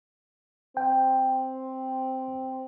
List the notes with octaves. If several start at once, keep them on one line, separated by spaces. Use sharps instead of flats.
C4 G5